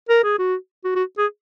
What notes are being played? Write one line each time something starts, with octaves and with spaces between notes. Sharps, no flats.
A#4
G#4
F#4
F#4
F#4
G#4